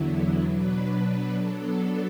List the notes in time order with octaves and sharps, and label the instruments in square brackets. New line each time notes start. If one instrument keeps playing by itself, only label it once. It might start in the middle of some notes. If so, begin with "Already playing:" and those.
Already playing: [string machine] E2 D3 F#3 B3 E4
B2 F#3 D4 B4
F#3 B3 D4 A4